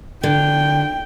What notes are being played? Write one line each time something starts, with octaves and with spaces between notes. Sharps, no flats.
D3 G5